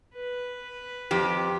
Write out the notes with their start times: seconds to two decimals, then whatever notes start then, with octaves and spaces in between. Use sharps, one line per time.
0.14 B4
1.11 F2 G4